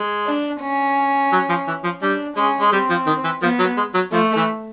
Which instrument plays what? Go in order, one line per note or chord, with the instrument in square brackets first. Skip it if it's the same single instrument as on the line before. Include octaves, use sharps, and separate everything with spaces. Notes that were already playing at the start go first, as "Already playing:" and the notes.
Already playing: [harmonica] G#3
[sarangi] D4
C#4
[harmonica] F#3
F3
E3
F3
[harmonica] G3 [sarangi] D4
[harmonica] G#3 [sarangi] C#4
[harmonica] G#3
[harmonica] G3 [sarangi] C4
[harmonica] F3
D#3
E3
[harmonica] F3 [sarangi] B3
[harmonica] F#3
G#3
F#3
[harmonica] F3 [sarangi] A3
[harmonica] E3